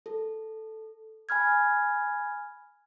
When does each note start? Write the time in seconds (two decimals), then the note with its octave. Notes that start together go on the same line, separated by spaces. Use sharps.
0.06 A4
1.29 G#5 B5 F6 G#6